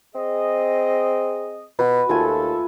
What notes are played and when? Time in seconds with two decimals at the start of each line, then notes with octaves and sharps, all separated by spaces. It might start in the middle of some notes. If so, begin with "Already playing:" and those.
0.15 C4 G#4 D#5
1.79 B2 F#4 B4
2.09 D#2 A3 F4 A4 G#5